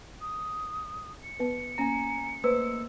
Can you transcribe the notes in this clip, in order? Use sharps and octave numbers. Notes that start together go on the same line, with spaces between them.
D#6
C#7
B3 B4
A#3 C#4 G#5 A#5 A#6
A3 A#3 B4 C5 E6